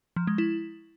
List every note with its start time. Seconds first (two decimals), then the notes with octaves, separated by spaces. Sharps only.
0.16 F3
0.27 G#3
0.38 E4